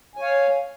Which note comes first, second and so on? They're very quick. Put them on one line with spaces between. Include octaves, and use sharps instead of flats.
G#5 C#5 F5